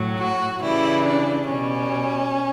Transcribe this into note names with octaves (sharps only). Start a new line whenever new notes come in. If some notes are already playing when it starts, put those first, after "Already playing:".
Already playing: A2 F#3
F#4
C#3 E3 G3 E4
D4
B2 G3 C#4